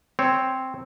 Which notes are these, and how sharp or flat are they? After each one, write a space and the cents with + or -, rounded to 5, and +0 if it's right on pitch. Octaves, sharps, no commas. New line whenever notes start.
C4 +0 C#5 +0